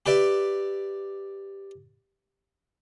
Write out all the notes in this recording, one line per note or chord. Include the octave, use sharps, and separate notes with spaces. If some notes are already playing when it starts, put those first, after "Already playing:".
G4 B4 D5 E5